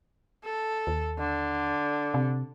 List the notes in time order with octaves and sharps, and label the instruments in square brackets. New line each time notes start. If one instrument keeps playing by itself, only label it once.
[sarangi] A4
[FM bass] D#2
[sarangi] D3
[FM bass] C3